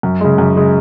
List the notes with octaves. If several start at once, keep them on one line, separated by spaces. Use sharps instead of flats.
F#2
C#3 G#3
F#2
C#3 G#3